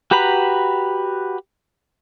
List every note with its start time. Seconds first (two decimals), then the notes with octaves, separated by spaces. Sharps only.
0.11 F#4 G4 B4 A#5 B5